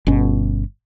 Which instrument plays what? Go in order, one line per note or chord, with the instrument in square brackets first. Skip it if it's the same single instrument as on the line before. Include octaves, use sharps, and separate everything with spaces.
[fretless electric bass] G1 B2 C#4